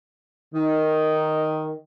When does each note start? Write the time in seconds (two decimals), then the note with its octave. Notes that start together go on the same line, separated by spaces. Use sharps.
0.55 D#3